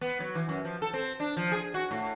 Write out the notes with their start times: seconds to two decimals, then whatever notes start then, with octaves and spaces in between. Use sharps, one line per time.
0.01 B3
0.20 F#3
0.35 E3
0.49 F#2
0.65 F3
0.82 A4
0.93 C4
1.20 D4
1.37 F3
1.52 G#4
1.74 F#4
1.91 A2